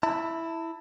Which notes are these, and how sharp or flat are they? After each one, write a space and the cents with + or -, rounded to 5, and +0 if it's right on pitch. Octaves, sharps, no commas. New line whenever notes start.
E4 +0 A5 +40